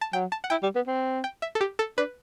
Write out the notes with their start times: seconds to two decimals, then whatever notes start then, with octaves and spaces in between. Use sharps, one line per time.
0.01 A5
0.13 F#3 G5
0.32 A5
0.44 F#5
0.50 E4 G5
0.63 G3
0.75 B3
0.87 C4
1.24 G5
1.42 E5
1.55 A4
1.61 G4
1.79 A4
1.98 D4 B4